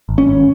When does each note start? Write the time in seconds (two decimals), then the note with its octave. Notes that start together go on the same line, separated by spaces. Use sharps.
0.09 G#1
0.18 C#4
0.28 G#1